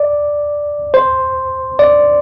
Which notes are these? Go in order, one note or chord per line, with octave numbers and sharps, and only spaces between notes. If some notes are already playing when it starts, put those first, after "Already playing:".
Already playing: D5
C5
D5